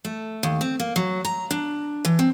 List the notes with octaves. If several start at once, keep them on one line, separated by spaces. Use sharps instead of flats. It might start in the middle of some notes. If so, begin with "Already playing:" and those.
A3
D#2
C4
A#3
F#3
A#5
D4
E3
C4